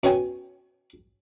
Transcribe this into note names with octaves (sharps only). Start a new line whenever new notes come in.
B2 C#4 G5 G#5